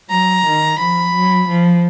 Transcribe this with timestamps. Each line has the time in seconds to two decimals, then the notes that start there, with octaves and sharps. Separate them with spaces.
0.10 F#3 A#5
0.45 D#3
0.79 F3 B5
1.13 F#3
1.47 F3